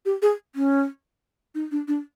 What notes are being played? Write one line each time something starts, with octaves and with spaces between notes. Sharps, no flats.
G4
G#4
C#4
D#4
D4
D4